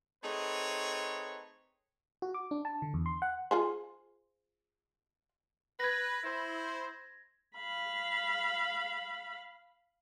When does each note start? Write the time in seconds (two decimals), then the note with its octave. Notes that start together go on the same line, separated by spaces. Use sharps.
0.24 A3 C4 D#4 G#4 B4 C#5
2.22 F#4
2.34 D6
2.51 D4
2.65 A5
2.82 D3
2.94 E2
3.06 C6
3.22 F#5
3.51 F4 G#4 C5
5.80 B4 G#6 A#6
6.24 E4 C5
7.56 F5 B5